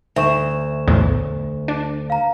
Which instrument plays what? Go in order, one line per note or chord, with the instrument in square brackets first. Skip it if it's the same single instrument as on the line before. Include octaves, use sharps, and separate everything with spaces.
[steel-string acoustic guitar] D2 [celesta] E5 C#6 E7
[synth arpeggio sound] B1 E2 A2
D4
[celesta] F5 A#5